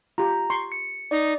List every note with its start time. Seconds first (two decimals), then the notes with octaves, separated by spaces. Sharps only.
0.18 F4 G4 A#5
0.50 C6 C#6
0.72 C#7
1.11 D#4 D5